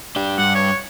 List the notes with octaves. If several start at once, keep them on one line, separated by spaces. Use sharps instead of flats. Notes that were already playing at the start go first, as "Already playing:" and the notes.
D4 G4
G2 F#5
C#5